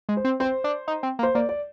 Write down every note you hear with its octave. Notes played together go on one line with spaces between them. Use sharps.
G#3
C5
C4
C4 C5
D4
D#4
C4
A#3
C5
A#3 D5
D5